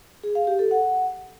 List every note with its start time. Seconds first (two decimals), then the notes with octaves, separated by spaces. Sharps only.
0.23 G#4
0.35 F5
0.47 G4
0.59 A4
0.71 F#5